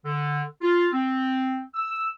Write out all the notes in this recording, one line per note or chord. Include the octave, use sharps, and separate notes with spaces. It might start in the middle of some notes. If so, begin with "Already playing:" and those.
D3
F4
C4
E6